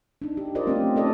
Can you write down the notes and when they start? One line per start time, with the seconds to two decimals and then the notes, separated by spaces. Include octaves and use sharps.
0.22 D4 D#4
0.37 G4
0.55 F4 G4 A#4 C5 D5 D#5
0.67 A3 C4 C#4 F4 G4
0.96 C#4 D#4 A4 D5 D#5